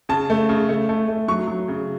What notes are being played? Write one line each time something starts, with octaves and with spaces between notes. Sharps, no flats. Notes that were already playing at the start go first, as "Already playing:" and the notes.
C#3 A5
A3
C#3
A3
A3
A3
F#3 C#6
F#3
C#3